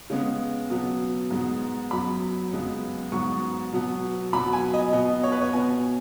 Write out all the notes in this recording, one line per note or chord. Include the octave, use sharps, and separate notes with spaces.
C#3 G#3 B3
B2 F#3 B3
G#2 G#3 B3
F#2 F#3 B3 B5
F#2 C#3 G#3 B3
G#2 F#3 B3 C#6
B2 F#3 B3
B2 F#3 B3 B5
G#5
D#5
B2 B3 D#5
C#5
B4
C#5
B2 B3 G#5